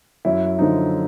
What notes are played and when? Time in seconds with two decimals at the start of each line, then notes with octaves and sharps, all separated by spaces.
0.25 F#2 E4
0.59 D3 F3 D#4